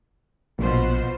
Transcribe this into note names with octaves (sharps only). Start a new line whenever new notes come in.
A#1 B2 F4 C5